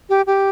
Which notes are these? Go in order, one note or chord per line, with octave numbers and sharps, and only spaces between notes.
G4
G4